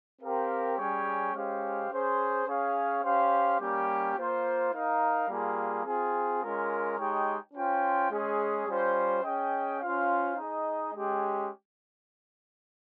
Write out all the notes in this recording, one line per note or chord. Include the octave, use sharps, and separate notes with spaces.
C4 G4 A#4 F5
G3 C#4 G#4 C#5 G5
G#3 C#4 G4 C5 F5
C#4 G#4 C5
C#4 G#4 C#5 F5
C#4 G4 C5 F5
G3 A#3 C#4 G4
A#3 F4 C5
D#4 A#4 F5
G3 A#3 F4 G#4
C4 F4 G#4
G#3 C#4 F4 A#4
G#3 D#4 G4 C#5 G5
C#4 F4 C5 G5
G#3 C#4 G#4
G3 C#4 F4 C5
C#4 G#4 D#5 G5
C#4 F4 C5 F5
D#4 G#4 D#5
G#3 C#4 G4